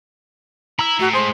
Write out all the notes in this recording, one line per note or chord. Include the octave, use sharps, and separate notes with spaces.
E4 A#5 E6
A2 F#4
G#3 G#4 C5